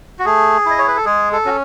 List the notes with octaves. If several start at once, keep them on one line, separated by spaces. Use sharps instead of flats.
F#4
A3 G#4
E4 D#5
C#5
B4
A4
G#3 G#4
A4
C#4 F#4